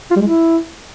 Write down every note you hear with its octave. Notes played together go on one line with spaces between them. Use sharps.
F4
G3
G#3
E4